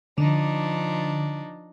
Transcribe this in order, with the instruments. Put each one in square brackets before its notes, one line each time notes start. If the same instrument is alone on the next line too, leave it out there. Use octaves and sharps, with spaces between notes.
[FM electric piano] D3 [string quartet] F3 D4 D#4